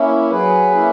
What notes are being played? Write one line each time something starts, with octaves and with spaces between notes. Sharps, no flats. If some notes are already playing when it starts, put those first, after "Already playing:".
Already playing: A#3 C#4 E4
F#3 G#4 B4
A#3 C#4 E4